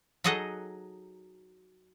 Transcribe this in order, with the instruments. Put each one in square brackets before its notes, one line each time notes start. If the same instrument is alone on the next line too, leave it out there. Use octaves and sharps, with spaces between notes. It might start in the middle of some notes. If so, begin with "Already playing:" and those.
[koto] F#3 D#4 G#4 A4 D#5 F#5